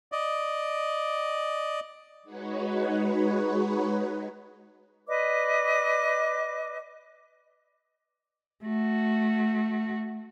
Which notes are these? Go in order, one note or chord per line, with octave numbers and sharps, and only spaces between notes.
D5 D#5
G#3 D#4 F#4 B4 C#5
B4 D5 D#5 D6
A3 F#4